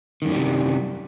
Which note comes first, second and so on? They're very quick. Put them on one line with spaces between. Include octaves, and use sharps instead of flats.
D#3 F#2 A2 G3 C3